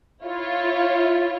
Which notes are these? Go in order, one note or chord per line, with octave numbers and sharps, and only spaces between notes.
E4 F4 C#5